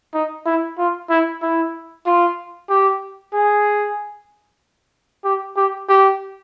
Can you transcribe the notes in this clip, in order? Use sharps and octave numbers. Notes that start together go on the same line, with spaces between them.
D#4
E4
F4
E4
E4
F4
G4
G#4
G4
G4
G4